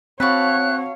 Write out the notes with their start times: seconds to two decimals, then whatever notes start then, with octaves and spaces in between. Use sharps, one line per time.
0.20 C4 F#4 C#5 F5 A5 B5 F#6